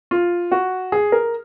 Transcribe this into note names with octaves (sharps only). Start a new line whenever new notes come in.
F4
F#4
G#4
A#4